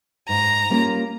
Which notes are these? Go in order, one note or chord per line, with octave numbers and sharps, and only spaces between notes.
G#2 A#5
G3 A#3 C#4 F4